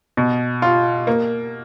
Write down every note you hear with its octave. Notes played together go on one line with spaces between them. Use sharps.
B2
F4
A#3